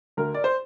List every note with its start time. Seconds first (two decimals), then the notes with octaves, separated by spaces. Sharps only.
0.17 D2 A#4
0.34 D5
0.44 C5